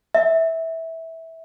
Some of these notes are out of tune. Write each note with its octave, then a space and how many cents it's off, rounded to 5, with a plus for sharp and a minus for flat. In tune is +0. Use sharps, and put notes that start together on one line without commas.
E5 -15